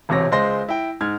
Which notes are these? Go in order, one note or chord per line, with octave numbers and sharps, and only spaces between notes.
E1 A1 C3 C#5 A#6
C#2 G#3 C5 C6 A#6
E4 G5
G#2 F6 G#6